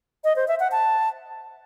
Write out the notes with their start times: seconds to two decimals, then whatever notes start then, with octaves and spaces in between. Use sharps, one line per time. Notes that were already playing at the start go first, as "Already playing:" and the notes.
0.24 D#5
0.36 C5
0.48 E5
0.60 F#5
0.71 A5